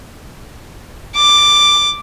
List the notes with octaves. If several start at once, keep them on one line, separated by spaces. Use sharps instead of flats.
D6